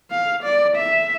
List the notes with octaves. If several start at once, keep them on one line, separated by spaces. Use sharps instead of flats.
F5
D5
E5